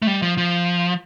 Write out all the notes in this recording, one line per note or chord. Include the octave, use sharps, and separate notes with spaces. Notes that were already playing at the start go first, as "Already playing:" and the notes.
A3
G3
F3
F3